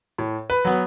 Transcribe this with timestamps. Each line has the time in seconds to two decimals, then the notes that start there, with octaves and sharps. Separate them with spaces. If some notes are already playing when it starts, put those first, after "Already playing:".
0.18 A2
0.50 B4
0.65 F#3 B3